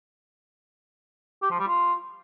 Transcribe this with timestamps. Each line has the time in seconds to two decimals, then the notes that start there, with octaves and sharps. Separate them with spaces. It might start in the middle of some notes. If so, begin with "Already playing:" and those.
1.42 G4
1.51 F3
1.59 G3
1.67 F4